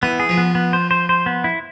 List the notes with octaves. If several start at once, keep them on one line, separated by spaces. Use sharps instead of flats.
E3 B3
G#4
F3
B3
B3
C5
C5
C5
B3
E4